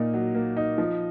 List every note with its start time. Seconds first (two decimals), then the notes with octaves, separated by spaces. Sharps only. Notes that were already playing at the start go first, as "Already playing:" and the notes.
Already playing: A#2 A#3 D#4
0.14 F#3
0.35 A#3
0.57 D#4
0.78 F3